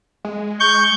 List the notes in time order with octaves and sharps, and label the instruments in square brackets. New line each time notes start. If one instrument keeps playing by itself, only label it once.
[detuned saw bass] G#3
[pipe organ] C#6 G6